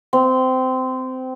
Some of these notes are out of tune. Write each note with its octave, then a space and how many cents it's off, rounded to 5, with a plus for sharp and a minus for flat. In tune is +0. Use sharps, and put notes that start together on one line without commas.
C4 -20